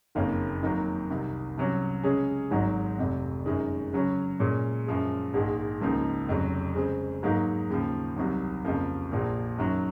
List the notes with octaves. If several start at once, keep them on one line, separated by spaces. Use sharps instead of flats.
F#1 F2 D#3 A#3 C#4
F2 D#3 F#3 A#3
C2 C3 D#3
C2 C3 F#3 C#4
C#3 G#3 C#4 G#4
G#1 G#2 D#3 F#3
F1 F2 C3
F#2 D#3 G#3
C#3 F#3 C#4
A#2 G#3 C#4
F#2 F3 G#3
A#1 G#2 D#3 G#3
C#2 C#3 F3 A#3 D#4
F1 F2 C#3 F#3
C#3 G#3 C4
G#2 F#3 A#3 D#4
D#2 C#3 F3
C2 C3 D#3 F#3
F2 C#3 F3 A#3
A#1 A#2 F3
F#2 D#3 F#3